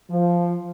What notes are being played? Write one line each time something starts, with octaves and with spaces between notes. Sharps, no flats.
F3